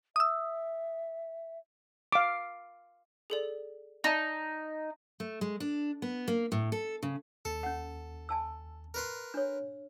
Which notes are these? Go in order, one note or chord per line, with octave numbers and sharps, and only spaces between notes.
E5 D#6 E6
F5 D6
G#4 A4 D5
D#4 D5 D#5 A5
A3
G#3
D4
B3
A#3
A2
A4
C#3
D#2 A4
C#4 F#5
G#5 A5 E6
A#4 B4 C6
D4 C#5